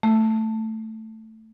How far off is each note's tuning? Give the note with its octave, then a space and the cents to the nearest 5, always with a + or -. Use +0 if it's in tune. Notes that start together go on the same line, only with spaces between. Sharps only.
A3 +5